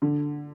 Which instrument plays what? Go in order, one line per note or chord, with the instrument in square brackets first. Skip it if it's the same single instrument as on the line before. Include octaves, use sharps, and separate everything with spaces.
[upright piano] D3